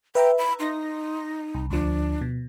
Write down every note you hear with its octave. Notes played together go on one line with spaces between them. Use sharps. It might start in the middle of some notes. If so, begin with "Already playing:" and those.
B4 E5 G5 A#5
B5
D#4 C6 A#6
C2
D2 F3 D4
B2